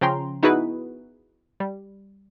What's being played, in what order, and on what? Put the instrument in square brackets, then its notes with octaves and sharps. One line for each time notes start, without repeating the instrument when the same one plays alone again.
[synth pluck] C#3 F3 C#4 G5 A#5 C6
B3 D#4 E4 F#4 G#4 B4
G3